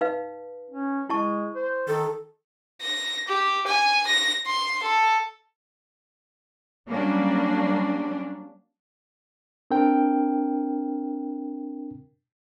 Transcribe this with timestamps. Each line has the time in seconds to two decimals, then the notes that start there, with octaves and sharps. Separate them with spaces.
0.01 D#4 B4 F5
0.71 C#4
1.09 G#3 E4 A5 C#6
1.55 C5
1.88 D#3 A4
2.81 A#6
3.28 G4
3.67 G#5
4.07 A#6
4.46 C6
4.82 A4
6.88 F#3 G3 A#3 C#4 D4
9.71 C4 D4 A#4 G5